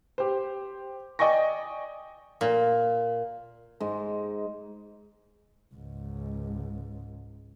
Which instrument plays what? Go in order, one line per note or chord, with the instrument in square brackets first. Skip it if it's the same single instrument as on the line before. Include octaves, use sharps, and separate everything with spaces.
[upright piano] G4 C5
D5 D#5 G5 G#5 C#6 A#6
[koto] A#2
[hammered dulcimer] G#2 G#3
[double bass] C#2 G#2